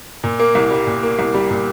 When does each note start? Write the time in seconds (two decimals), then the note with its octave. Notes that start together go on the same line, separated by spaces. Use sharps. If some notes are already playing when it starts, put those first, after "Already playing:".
0.24 A#2
0.39 A#3
0.55 C2
0.71 G3
0.86 A#2
1.03 A#3
1.19 C2
1.34 G3
1.50 A#2